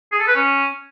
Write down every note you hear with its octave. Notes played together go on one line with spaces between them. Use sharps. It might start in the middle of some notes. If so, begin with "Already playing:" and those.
G#4
A4
B4
C#4